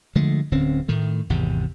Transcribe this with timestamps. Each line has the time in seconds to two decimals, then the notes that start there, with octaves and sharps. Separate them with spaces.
0.15 D3 F3 G#3 A3
0.52 D1 D3 C4 C#4
0.88 A2 D#3 A3
1.30 G#1 E2 C3